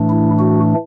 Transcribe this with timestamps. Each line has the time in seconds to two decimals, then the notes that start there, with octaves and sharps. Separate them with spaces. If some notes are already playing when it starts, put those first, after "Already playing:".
Already playing: A2 E3 A3 D4
0.09 E4
0.39 F#4